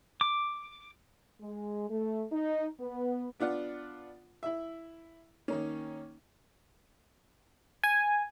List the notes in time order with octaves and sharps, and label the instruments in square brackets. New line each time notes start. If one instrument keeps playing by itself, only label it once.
[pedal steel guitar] D6
[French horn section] G#3
A3
D#4
B3
[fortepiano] B3 D4 F4 F#5
E4 E5
D#3 A#3 C#4
[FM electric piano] G#5